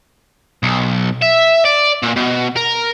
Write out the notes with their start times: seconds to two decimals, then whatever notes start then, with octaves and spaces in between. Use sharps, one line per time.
0.63 B1
1.22 E5
1.65 D5
2.03 A#2
2.16 B2
2.56 A#4